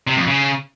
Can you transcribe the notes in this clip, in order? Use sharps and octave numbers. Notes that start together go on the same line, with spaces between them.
C3
F2
C#3